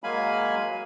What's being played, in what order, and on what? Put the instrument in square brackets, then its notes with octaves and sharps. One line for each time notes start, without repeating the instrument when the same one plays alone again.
[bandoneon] F#3 G#3 A#3 F5 G#5 B5